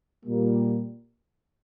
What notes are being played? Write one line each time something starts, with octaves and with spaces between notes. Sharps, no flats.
A#2 G3 A#3